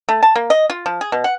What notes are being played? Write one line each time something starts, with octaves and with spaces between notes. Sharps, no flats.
A3
A5
A#3
D#5
F4
F3
G#4
B2
F#5